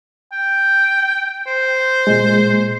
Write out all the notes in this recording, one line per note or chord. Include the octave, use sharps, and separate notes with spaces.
G5
C5
A#2 G#3